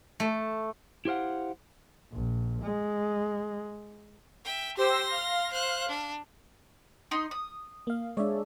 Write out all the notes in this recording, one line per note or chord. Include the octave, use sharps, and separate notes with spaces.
A3
E4 G4 C5 F5 F#5
A#1
G#3
E5 G5
G4 C5 C6 E6 A#6
F5
C5 F#6
D4
D#4 D#5 C6
D#6
A#3 F5
G#3 D4 C#5 D5 E5